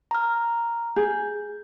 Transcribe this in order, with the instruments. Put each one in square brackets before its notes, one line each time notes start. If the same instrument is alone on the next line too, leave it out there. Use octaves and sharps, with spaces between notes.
[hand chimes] A#5 F6
[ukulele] G#4 [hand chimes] G6